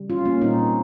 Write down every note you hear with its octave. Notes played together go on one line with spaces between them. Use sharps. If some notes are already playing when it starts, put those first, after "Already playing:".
Already playing: C#3 G3
C#4 F4
A#3 C#4
A#2 G3 A#3 C4 D#4